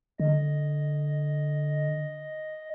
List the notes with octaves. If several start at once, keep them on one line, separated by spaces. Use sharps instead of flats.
D3 D#5